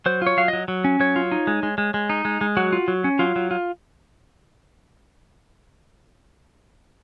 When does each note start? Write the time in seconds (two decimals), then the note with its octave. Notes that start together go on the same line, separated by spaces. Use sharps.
0.06 F#3 C5
0.22 F4 C#5
0.37 F#3 F5
0.48 F#3 D#5
0.68 F#3
0.84 C#4
1.00 F#3 C#5
1.16 F4
1.32 D#4
1.47 G#3
1.63 G#3
1.78 G#3
1.94 G#3
2.10 D#4
2.25 G#3
2.41 G#3
2.57 F#3 F#4
2.73 F4
2.88 F#3
3.04 C#4
3.19 F#3 F4
3.36 F#3
3.51 F4